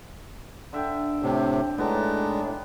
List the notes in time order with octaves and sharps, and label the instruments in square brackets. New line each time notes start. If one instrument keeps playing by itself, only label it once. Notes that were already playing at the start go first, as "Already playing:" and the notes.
[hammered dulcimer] D3 E5 G5
[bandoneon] A2 C3 [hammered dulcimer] D4 G4
[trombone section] A2 D4 [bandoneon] G#3 [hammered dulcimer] B3 D#4